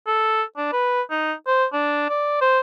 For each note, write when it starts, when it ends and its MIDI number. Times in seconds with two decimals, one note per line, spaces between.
0.07 0.43 69
0.57 0.68 62
0.72 1.02 71
1.11 1.33 63
1.47 1.65 72
1.73 2.09 62
2.10 2.40 74
2.41 2.60 72